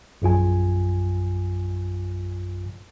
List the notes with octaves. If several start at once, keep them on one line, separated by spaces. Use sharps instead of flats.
A#1 F#2 F4 G#5